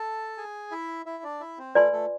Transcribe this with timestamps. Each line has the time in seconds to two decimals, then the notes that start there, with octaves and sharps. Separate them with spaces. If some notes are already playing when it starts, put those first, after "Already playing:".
Already playing: A4 A5
0.37 G#4 G#5
0.71 E4 E5
1.06 E4 E5
1.23 D4 D5
1.40 E4 E5
1.58 C4 C5
1.75 A3 F4 A4 B4 D5 G#5 C6
1.92 A3 A4